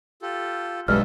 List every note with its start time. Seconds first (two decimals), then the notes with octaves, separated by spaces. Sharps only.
0.22 F4 G4 A4
0.88 B1 G2 G#3 A4 D#5 E5 F6